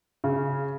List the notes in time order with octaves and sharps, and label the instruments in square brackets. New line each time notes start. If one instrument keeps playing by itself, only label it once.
[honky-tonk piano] C#3